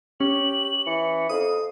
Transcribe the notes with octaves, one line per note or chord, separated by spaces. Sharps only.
C#4 G4 F#7
E3 C#7
F2 F5 D#6